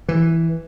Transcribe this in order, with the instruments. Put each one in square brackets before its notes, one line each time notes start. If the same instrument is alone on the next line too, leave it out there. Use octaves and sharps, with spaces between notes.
[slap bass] E3